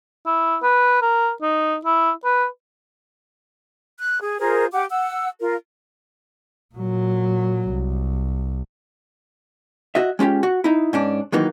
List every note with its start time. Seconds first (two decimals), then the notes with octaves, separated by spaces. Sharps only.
0.26 E4
0.63 B4
1.02 A#4
1.42 D#4
1.85 E4
2.25 B4
3.99 F#6
4.21 G#4
4.39 F4 G#4 A#4 C5
4.72 G4 F#5 D6
4.90 F#5 E6
5.39 F4 A#4
6.75 A#2 F#3
7.70 C2
9.95 F#4 D#5 E5
10.19 G#3 C#4 F4 G4
10.43 F#4
10.64 D#4 E4
10.93 G#2 C#4 D4
11.32 D#3 E3 F#3 A#3 D#4